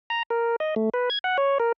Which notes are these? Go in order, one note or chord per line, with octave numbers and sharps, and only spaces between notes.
A#5
A#4
D#5
A3
B4
G#6
F#5
C#5
A#4